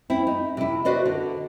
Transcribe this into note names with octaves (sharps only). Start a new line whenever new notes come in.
C4 E4
D#4
C3 E4
F#4 B4 C5 D5 D#5
D3